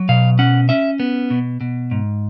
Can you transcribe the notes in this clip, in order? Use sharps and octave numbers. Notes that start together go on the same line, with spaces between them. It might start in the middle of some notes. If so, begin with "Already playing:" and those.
Already playing: F#3
B2 F5
C#4 F#5
C#4 E5
B3
B2
B2
G#2